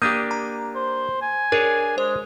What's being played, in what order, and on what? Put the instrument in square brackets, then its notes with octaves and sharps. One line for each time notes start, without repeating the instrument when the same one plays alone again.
[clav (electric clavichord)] A#3 D4 G4 [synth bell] D#6 G6 D#7
[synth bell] A#5
[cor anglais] C5
G#5
[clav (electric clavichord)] D4 G#4 C#5 [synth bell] A#4
[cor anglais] G#3 [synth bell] C5